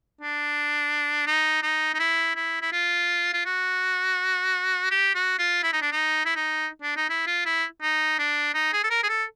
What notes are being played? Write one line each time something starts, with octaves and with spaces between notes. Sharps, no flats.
D4
D#4
D#4
D#4
E4
E4
E4
F4
F4
F#4
G4
F#4
F4
E4
D#4
D4
D#4
E4
D#4
D4
D#4
E4
F4
E4
D#4
D4
D#4
G#4
A4
A#4
G#4
A4